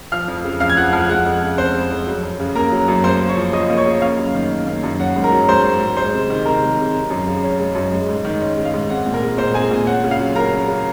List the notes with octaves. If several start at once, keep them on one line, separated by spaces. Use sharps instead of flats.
F3 F5 F6
F2
C#3
F2 F5 F6
G#6
F3 F#5 F#6
F2 F5 F6
G#3 F#5 F#6
F2
C#3
C4 C5 C6
G#3
F2
F#3
F#2
C#3
A#3 A#4 A#5
F#3
F#2
A#3 C5 C6
C#3
C#5 C#6
F3
C#3 D#5 D#6
A#3
C#5 C#6
C#3
A#3 F5
F#2
D#3
C#4
A#3
F#2
C#4 F#5
G#2
A#4 A#5
F#3
G#2 C5 C6
C#4
G#2
G#3 C5 C6
C3
D#3
C3 A#4 A#5
G#3
C3
G#3
F#2
C#3
C#4
G#3
F#2
G#3
G#2
D#3
C#4
G#3
F5
G#2
C4 F#5
A#2
A#4 A#5
G#3
A#2 C5 C6
C4 G#4 G#5
A#2
C#4 F#5
C#3
F5
F#3
C#3 A#4 A#5
C#4
C#3